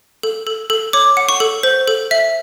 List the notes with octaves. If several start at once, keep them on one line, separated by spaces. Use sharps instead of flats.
A4
A4
A4
C#5 D6
F#5
C#6
A4
C5
A4
E5